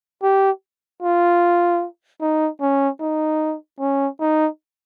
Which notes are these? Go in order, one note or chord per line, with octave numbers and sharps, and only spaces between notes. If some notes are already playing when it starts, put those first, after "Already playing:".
G4
F4
D#4
C#4
D#4
C#4
D#4